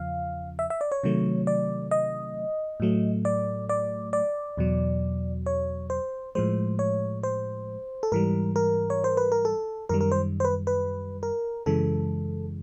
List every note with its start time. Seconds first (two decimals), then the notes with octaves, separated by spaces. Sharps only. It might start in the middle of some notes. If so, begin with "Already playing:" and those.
Already playing: E2 C#3 F3 F5
0.59 E5
0.70 E5
0.81 D5
0.92 C#5
1.04 C3 D#3 F#3 A3
1.47 D5
1.91 D#5
2.80 A2 F#3 A3
3.25 D5
3.69 D5
4.13 D5
4.57 E2 B2 F#3
5.46 C#5
5.90 C5
6.35 A2 F3 G#3 C5
6.79 C#5
7.23 C5
8.03 A4
8.12 G#2 E3 G3 A#4
8.56 A#4
8.90 C#5
9.04 C5
9.17 B4
9.32 A#4
9.45 A4
9.89 F#2 D#3 G3 A#4
10.01 A#4
10.12 C5
10.40 C5
10.45 B4
10.67 B4
11.23 A#4
11.66 F#2 C#3 E3 G#3 A4